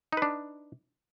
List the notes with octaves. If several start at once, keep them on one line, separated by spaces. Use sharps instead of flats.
D4 D#4 B4